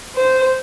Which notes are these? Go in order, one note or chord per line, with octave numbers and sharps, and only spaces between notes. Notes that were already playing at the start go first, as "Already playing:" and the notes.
C5